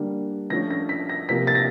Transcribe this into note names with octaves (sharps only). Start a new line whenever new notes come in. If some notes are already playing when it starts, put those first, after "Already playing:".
Already playing: D3 G3 A#3
D3 F3 A3 C#4 A#6
A#6
B6
A#6
C3 F3 A#3 B6
A6
A#6